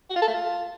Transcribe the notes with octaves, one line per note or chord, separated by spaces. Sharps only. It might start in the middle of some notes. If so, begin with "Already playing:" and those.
F#4
F4
A4
A3
F4